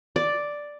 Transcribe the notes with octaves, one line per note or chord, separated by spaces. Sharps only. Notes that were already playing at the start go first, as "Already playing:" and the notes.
D5